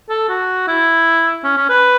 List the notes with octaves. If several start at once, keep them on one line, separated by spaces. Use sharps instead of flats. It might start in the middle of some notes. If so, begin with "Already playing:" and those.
A4
F#4
E4
C#4
C#4
B4